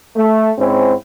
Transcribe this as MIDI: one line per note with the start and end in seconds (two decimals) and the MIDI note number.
0.16 0.51 57
0.58 0.94 44
0.58 0.94 60
0.58 0.94 61
0.58 0.94 64